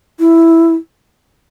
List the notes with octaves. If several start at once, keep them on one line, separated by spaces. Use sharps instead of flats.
E4